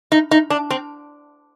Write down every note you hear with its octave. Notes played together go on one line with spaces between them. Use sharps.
D#4
D#4
D4
C4